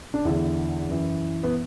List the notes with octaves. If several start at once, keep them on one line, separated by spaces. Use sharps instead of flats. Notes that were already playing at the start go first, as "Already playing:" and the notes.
D4
E2 D3 E4
F#2 E3
B3